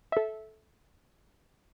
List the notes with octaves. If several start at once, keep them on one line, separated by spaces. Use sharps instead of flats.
A4 E5